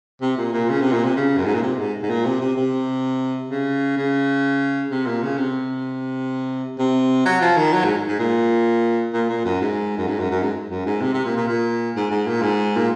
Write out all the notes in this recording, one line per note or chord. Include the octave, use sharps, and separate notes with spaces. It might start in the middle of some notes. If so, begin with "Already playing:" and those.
C3
A#2
A#2
C#3
C3
A#2
C3
C#3
F#2
G#2
A#2
C3
G#2
G#2
A#2
C3
C3
C3
C#3
C#3
C3
A#2
C#3
C3
C3
F#3
F3
D#3
F#3
G#2
G#2
A#2
A#2
A#2
F#2
G#2
F#2
G#2
F#2
F#2
G#2
F#2
G#2
C3
C3
A#2
A#2
A#2
G#2
G#2
A#2
G#2
A#2